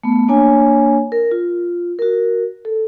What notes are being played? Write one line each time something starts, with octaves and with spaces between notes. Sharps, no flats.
A3 B3
A#3 D4 C#5 G#5
A#4
F4
F#4 A#4
A4